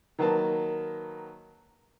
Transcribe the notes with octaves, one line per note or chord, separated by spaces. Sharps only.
D#3 F#3 A#3 B4 A5